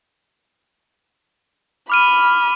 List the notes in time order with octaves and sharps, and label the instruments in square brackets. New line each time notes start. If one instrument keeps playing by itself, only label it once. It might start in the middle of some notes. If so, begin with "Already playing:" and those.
[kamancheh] B5 [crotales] D6 F6 D#7